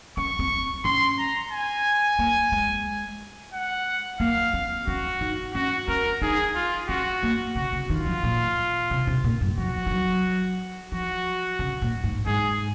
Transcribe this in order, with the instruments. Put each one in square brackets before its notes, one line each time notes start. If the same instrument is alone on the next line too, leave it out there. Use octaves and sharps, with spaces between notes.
[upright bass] C#4 [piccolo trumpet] C#6
[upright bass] C4
[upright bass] C#4 [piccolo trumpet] C6
[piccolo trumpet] A#5
G#5
[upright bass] A#3
G#3
[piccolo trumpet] F#5
[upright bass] A#3 [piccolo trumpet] F5
[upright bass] C4
[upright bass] C#4 [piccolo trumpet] F#4
[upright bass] D#4
[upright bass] C#4 [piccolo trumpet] F#4
[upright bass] C#4 [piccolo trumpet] A#4
[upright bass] D#4 [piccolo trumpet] G#4
[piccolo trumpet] F4
[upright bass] C#4 [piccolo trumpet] F#4
[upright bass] A#3
[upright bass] C#3 [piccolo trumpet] F#4
[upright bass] C#3
[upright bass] D#3 [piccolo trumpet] F4
[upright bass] F3
A#2
C3
C3
A#2
F#2
[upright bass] F3 [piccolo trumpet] F#4
[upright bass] F3
F#3
[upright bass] F3 [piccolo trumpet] F#4
[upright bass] C#3
A#2
G#2
[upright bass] G#2 [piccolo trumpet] G#4